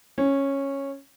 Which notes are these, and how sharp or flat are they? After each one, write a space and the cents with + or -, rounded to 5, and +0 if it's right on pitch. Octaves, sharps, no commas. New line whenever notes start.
C#4 -10